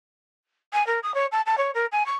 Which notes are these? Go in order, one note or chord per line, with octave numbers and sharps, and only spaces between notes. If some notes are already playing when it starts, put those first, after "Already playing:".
G#5
A#4
D#6
C#5
A5
A5
C#5
A#4
G#5
C#6